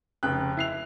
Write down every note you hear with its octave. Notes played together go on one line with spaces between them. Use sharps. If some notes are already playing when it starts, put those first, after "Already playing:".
F1 C#3 G5 F#6
E4 C7 F7